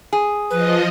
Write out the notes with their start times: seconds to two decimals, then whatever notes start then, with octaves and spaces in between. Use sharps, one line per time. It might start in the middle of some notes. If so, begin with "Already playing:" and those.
0.13 G#4
0.50 F3 B4 D#5